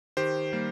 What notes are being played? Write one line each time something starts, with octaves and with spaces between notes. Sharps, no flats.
D#3 G4 C5
G3 A#3